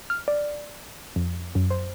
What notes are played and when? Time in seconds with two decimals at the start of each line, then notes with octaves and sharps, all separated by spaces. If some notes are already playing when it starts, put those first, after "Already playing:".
0.10 F6
0.28 D5
1.16 F2
1.55 F#2
1.70 C5